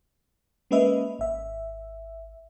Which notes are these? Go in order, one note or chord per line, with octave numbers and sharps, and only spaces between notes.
G#3 A#3 C#4 B4 D#5 E5
G#1 E5